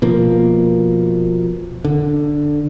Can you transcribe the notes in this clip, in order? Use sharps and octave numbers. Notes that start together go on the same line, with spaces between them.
B2 F3 A#3
D3